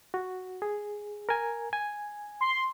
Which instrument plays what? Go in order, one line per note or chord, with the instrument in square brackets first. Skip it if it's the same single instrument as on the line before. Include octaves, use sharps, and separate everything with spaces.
[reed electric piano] F#4
G#4
A#4 G#5
G#5
[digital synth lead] C6